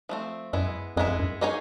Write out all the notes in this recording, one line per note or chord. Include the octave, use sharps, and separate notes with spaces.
F3 A3 C4
F#2 G#3 B3 E4
F2 G#3 B3 E4
F2
F#2
A#3 D#4 G#4 C#5